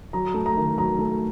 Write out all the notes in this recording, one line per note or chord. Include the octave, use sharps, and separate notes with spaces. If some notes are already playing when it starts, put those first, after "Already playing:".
F#3 A#5
A3
A#5
D#3
F#3 A#5
A3